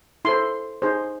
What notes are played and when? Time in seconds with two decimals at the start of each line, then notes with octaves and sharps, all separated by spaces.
0.25 E4 A4 C5 C6
0.82 D#4 G#4 C5